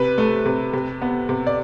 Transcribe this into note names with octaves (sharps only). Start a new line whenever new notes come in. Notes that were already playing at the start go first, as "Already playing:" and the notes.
Already playing: C3 B4
A3
C3
C3
B3
C3
D5